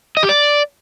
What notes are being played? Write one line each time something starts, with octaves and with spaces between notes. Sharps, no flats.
D#5
G4
D5